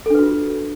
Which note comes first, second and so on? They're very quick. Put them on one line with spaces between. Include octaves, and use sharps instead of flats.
A4 D4 B4 F#4 F4